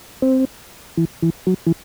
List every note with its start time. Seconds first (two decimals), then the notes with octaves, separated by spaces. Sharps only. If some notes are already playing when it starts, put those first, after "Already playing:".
0.22 C4
0.97 E3
1.22 E3
1.47 F#3
1.67 E3